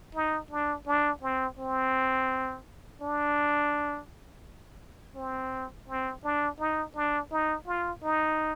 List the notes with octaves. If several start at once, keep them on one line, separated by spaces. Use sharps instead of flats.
D#4
D4
D4
C4
C4
D4
C4
C4
D4
D#4
D4
D#4
F4
D#4